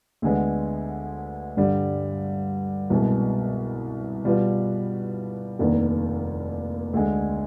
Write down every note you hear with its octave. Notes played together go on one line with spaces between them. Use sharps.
D2 D3 G#3 B3
G2 D3 G3
C2 B2 G#3 B3
B2 G3 B3 F4 B4
F1 D#2 D#3 B3 D4
D2 D3 G#3